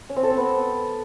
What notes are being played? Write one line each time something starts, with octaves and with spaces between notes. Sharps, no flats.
C#4
C4
A4
C4
B3